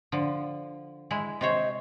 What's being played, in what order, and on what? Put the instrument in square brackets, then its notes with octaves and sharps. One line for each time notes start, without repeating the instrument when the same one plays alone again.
[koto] D3 F3
G#3 E4
[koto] C3 C5 C#5 [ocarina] D#5